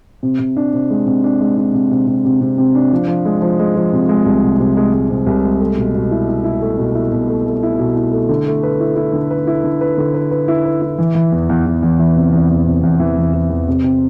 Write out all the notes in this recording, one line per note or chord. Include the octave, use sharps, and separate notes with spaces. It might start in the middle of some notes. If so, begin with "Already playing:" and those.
C3
C3
D4
C3
G#3
C3
D4
G#3
D4
C3
C3
C3
C3
C3
C3
D4
F3
F3
G#3
F3
G#3
F3
C3
G#3
C2
C3
C3
G#3
G#3
C3
C2
G#3
A3
B2
B2
E4
E4
E4
A3
B2
E4
B2
A3
A3
E4
B2
E4
A3
D3
A3
B4
E4
E4
D3
B4
E4
D3
B4
D3
B4
B4
E4
B4
E4
E3
E3
E2
E2
E2
E2
E3
C3
E2
E2
C3
E2
E3
E2
E3
E2
C3
C3